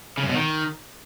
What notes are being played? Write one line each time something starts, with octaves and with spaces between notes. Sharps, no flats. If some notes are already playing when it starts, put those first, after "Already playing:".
C#3
F#2
B2
D#3